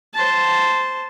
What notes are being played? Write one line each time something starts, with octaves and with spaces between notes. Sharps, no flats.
C5 A5